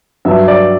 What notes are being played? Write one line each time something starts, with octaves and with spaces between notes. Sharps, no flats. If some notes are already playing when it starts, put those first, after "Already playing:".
G2 F#3 E5
D5